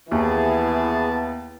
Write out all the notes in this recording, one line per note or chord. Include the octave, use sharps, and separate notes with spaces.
D#2 E3 B3 E4 G#4 A5